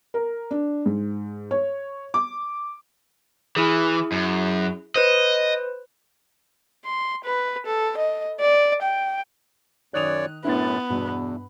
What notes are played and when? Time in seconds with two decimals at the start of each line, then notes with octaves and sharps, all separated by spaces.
0.14 A#4
0.51 D4
0.86 G#2
1.51 C#5
2.14 D6
3.56 E3 E4 G#4
4.12 F#2
4.96 B4 C5 D#5
6.85 C6
7.24 B4
7.66 A4
7.98 D#5
8.40 D5
8.82 G5
9.94 F#2 D#3 C#5 D5 D#6 F#6 F7
10.45 F#2 A2 B3 D4 E4 C6 A6
10.90 E2 G2 B2 D4